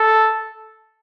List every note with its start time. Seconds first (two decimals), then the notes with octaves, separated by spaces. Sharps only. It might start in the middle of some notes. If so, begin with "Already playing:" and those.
Already playing: A4